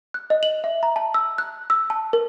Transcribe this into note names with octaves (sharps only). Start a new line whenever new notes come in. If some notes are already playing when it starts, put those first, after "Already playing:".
F#6
D#5
F#7
E5
A#5
A5
E6
F#6
E6
A5
A#4